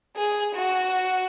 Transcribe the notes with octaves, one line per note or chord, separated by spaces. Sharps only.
G#4
F#4